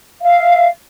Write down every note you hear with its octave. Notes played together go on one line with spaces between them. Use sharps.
E5 F5